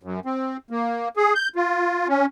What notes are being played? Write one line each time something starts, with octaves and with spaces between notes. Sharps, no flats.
F#2
C4
A#3
G#4
G6
F4
C#4